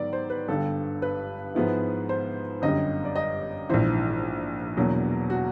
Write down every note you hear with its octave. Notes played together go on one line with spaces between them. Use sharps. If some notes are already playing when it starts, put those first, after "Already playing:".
Already playing: G#2 D#3 F#3 B3 D5
C5
B4
G1 G2 D3 G3 A4
B4
G#2 F3 G#3 B3 E4
C5
G1 F#2 D3 G3 D#5
D5
D#5
A#1 G#2 E3 C5
E2 B2 F#3 A#3 D4
F#4